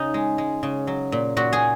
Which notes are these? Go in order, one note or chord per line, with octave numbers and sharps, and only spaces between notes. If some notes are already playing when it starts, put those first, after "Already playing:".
Already playing: C#3 D#4
G#3
G#3
C#3
F#3
A#2
A#2 F#4
G#4